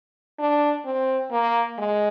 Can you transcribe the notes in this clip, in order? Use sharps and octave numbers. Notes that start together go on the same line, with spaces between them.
D4
C4
A#3
G#3